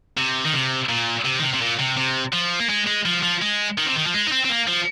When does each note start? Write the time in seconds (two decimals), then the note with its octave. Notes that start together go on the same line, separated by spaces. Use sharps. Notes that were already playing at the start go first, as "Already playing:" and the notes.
0.17 C3
0.45 D#3
0.53 C3
0.89 A#2
1.25 C3
1.39 D#3
1.43 C3
1.53 C3
1.61 A#2
1.79 C3
1.97 C3
2.33 F3
2.60 A#3
2.70 G#3
2.87 G#3
3.05 F3
3.23 F3
3.42 G#3
3.78 D#3
3.86 C3
3.96 D#3
4.06 F3
4.13 G#3
4.27 D#4
4.32 C4
4.44 C4
4.49 A#3
4.67 F3